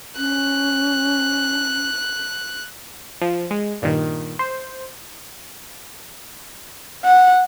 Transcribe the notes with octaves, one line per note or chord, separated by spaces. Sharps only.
C#4 F#6
F3
G#3
G2 A#2 D#3
C5
F#5